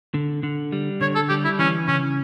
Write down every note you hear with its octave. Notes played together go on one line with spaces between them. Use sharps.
D3
D3
G3
D3 C#5
A4
G3 G4
E4
E3 C#4
C#3 C#4